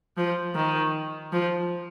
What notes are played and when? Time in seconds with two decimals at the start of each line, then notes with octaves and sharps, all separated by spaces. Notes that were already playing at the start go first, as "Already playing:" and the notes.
0.17 F3
0.55 D#3
1.33 F3